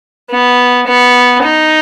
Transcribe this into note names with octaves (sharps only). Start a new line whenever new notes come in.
B3
B3
D#4